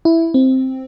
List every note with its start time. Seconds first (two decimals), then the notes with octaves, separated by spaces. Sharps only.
0.05 E4
0.34 C4